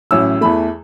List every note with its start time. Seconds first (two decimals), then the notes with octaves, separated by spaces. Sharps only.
0.11 A1 A2 F#3 C#4 E4 E6
0.41 E2 E3 A3 B5